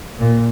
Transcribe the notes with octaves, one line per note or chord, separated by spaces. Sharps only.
A#2